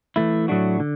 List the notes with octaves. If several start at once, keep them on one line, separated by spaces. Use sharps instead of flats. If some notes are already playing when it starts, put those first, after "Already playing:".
E3 A3 E4
A2 F#3 A3 D4 F#4
D3